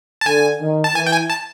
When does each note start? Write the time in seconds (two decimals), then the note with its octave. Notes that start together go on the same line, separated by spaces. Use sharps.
0.21 A5
0.26 D3 G#5
0.61 D#3
0.84 A5
0.95 E3 G#5
1.06 G5
1.12 G#5
1.30 A5